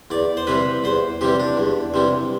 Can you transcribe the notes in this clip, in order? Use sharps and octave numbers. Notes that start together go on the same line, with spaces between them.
E2 D5
C5
C3 E3 G3 B4
E2 C5
C3 E3 G3 G4
D4
E2
C3 E3 G3